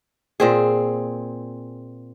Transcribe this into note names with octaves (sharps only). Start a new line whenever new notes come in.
A#2 C4 G#4